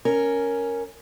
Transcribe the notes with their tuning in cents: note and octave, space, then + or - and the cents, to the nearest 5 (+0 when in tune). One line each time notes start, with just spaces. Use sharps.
C#4 +0 A#4 +0